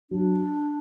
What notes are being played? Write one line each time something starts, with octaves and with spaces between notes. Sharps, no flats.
F#3 D4